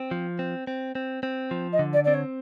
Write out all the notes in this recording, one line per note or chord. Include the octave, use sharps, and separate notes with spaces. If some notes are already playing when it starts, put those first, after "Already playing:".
Already playing: C4
F3
C4
C4
C4
C4
F3
D#5
D3
D5
C4 D5
C#5